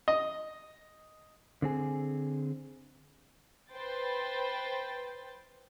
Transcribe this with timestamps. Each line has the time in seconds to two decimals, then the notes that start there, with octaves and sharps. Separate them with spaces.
0.08 D#5
1.62 D3 C4 G#4
3.72 B4 C5 G5 A6